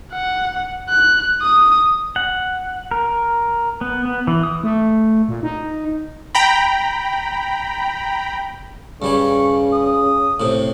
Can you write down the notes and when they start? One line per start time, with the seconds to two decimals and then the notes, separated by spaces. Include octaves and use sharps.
0.13 F#5
0.89 F#6
1.41 D#6
2.16 F#5
2.91 A#4
3.81 B3
4.05 B3
4.27 E3
4.43 D#6
4.64 A3
5.29 A#2
5.43 D#4
6.35 G5 A#5 B5
9.02 G2 C#3 G3 G#5 C#6
9.73 D#6
10.40 A2 C3